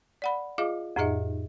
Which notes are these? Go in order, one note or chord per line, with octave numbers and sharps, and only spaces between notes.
D5 F#5 B5
F4 G#4 D#5 F5 D6
F2 A2 D#4 G#4 D#5 E5